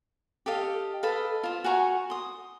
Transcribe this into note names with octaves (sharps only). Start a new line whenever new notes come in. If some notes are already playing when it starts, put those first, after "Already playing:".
G4 A4 D#5 F5
A4 B4 D#5 F5
F4 C5
F#4 G#5 A#5 C#6
C6 D#6